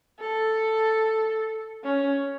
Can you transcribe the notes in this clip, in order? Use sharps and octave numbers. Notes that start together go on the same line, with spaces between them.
A4
C#4